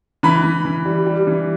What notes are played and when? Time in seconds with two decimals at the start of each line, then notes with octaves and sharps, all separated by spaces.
0.23 E3 B5
0.44 E3
0.65 E3
0.85 G3
1.06 G3
1.27 E3